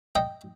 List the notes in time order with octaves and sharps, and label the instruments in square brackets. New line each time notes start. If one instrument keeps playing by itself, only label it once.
[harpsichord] D#5 G5